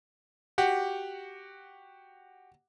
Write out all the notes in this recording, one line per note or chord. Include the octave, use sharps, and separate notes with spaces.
F#4 G4 F#5